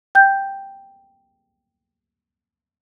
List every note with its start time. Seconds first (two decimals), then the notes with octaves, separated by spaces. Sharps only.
0.15 G5 G6